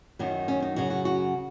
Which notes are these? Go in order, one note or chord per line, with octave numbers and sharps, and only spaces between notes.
F#2 D#3 F#3 D#4
C#4
D#4
F#2 C#3 F#3 F#4
F#4
F#4